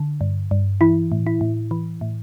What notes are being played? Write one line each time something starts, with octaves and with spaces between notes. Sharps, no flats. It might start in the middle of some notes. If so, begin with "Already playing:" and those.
Already playing: D3
G2
G2
E3 E4
A2
E4
A2
E3
A2